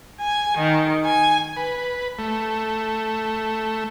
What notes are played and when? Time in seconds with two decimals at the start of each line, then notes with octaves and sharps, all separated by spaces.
0.20 G#5
0.57 D#3
1.05 G#5
1.57 B4
2.19 A3